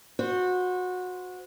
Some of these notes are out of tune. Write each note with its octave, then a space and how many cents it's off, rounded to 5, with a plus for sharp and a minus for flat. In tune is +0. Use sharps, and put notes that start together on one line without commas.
F#4 -20 C5 -10